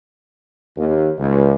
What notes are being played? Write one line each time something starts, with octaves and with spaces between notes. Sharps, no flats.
D#2
C#2